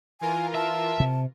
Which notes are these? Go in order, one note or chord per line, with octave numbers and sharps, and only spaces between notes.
E3 F4 A#4 G#5
E5 A5
C3